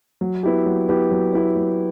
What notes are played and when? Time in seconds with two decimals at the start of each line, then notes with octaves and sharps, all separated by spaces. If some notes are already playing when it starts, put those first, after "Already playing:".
0.21 F#3
0.43 B3 E4 G4
0.66 F#3
0.88 B3 E4 G4
1.11 F#3
1.33 B3 E4 G4
1.56 F#3